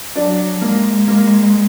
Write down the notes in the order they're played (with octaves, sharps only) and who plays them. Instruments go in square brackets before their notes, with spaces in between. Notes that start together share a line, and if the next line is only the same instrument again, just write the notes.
[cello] F#3 [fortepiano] D4
[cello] G#3 [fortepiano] A#3
[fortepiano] A#3